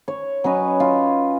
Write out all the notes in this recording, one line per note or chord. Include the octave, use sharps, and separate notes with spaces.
C#5
F#3 C#4 B4 D#5
F4